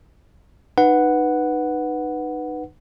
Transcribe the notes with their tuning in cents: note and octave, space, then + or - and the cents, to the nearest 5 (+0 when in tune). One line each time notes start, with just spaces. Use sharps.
D#4 -25 B4 +0 F#5 +0